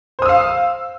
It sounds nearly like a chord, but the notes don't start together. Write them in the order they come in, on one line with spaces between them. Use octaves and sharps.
C5 D#6 E6 F5